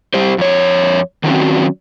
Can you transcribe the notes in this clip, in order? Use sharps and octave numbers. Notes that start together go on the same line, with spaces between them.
G3 G4 C5
F2 C#5
D#3 F#3 C4 C#4 F#4